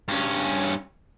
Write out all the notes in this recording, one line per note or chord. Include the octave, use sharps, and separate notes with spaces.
G2 C#4